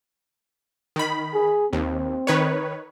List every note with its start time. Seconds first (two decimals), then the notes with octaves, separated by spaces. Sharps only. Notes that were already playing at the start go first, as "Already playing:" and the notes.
0.96 D#3 B5
1.34 G#4
1.73 D#2 C4
2.27 D#3 B4 C#5